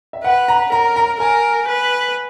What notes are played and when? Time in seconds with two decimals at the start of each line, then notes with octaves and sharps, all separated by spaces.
0.13 E5
0.24 B4 F#5
0.48 A#5
0.72 A#4 A#5
0.96 A#5
1.20 A#4 G#5
1.68 B4